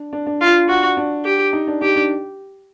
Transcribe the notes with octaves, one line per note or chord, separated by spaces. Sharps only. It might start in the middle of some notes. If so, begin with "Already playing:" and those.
Already playing: D4
D4
D4
F4
F#4
D4
G4
D#4
D4
D#4 G4
D4